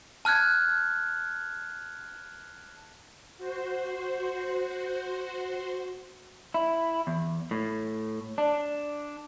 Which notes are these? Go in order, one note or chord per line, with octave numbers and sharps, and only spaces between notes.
A5 F6 F#6 G#6
F#4 C5
E4
E2
A2
D4